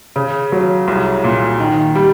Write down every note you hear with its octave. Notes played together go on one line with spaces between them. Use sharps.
C#3
F#3
C2
A#2
D#3
G3